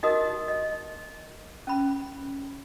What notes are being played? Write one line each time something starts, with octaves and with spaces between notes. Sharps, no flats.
D#4 F#4 A#4 D#5 D#6
D#5
C#4 B5